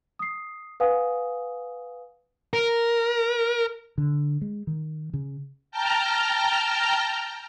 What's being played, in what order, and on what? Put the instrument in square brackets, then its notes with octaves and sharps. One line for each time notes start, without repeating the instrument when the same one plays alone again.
[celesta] D#6 C7
B4 F5 F#5 G#5 D#6
[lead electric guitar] A#4
[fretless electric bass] D3
G#3
D#3
C#3
[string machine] G5 A5 A#5 F6 G6